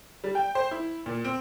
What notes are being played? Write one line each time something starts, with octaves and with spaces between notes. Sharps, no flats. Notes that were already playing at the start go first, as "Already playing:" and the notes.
G3
G5
C5
E4
A#2
C4